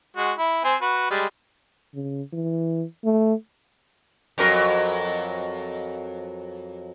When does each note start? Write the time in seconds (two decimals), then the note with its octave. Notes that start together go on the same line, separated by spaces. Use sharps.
0.17 G#3 F#4
0.38 E4
0.64 C4 C5 G#5
0.82 F#4 B4
1.10 G3 G#3
1.95 C#3
2.33 E3
3.05 A3
4.38 F2 F#3 A#4